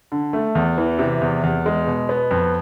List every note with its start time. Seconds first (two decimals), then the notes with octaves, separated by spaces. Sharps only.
0.12 D3
0.33 A3
0.55 E2
0.78 E3
0.99 C3
1.21 E2
1.43 E2
1.66 G#3
1.87 B2
2.09 B3
2.31 F2